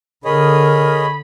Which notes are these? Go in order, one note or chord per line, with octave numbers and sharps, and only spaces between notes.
D3 G#4 A#4 C#5 D#5 B5